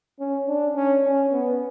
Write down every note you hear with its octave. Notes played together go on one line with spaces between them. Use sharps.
C#4
D4
C#4
C#4
B3